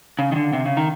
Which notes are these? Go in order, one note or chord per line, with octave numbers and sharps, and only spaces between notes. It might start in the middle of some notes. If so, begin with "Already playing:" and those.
C#3
D#3
D3
C3
C#3
D#3